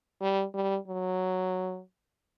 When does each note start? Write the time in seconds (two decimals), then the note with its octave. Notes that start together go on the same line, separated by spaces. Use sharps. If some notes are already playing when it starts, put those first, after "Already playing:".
0.21 G3
0.54 G3
0.88 F#3